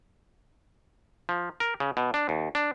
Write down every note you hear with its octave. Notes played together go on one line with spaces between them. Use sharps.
F3
A#4
C#3
B2
D4
D#2
D4